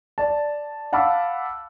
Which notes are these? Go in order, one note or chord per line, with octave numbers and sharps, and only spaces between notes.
D5 A5
F5 F#5 A5 B5 D6 E6